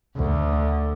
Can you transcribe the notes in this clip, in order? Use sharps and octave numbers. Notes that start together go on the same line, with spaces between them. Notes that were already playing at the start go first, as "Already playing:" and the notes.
D2